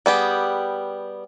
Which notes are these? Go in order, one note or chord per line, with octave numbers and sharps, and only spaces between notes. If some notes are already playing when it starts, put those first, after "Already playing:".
G3 B3 G4 G#4